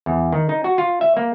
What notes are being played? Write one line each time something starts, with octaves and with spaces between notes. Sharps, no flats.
E2
D#3
D#4
F#4
F4
E5
A#3